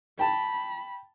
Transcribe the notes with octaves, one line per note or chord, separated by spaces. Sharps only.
G5 A5 B5